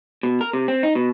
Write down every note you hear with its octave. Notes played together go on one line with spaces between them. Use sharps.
B2
A#4
C3
C4
D#4
B2